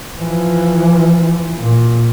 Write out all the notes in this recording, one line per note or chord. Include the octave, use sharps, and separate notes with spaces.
E3 F3
A#2